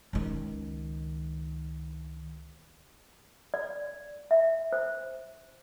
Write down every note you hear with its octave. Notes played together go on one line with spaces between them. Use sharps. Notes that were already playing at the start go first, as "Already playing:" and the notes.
C#2 D#3
D5
E5
C5